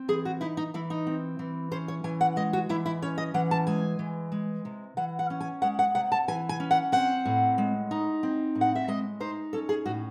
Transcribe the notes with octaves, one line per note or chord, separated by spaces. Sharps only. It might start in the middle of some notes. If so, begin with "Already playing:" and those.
Already playing: C4
E3 G#4
F#4
D#4 E4
D#4
E3 E4
D#4
C4
E3
C#4 C5
C#5
E3 G#5
F#5
G#3 D#5
F#4
E3 E4
E4
C#4 C#5
D#5
E3 F#5
A5
G#3 G#5
E3
G#3
C3
E3 F#5
F#5
C#4
G#5
G#3 F#5
F#5
C3 F#5
A5
E3 G#5
G#5
C#4
F#5
C4 F#5
A2
G#3
D#4
C4
A2
F#5
E5
G#3 D#5
D#4 C5
C#4 A4
G#4
A2 F#4